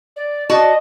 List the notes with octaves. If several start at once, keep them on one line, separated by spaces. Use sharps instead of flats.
D5
F#4 D5 D#5 A5